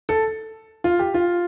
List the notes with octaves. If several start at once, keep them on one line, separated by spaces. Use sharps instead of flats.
A4
F4
G4
F4